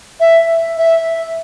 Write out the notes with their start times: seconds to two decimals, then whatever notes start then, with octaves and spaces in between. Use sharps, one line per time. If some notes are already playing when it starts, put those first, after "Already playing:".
0.20 E5
0.77 E5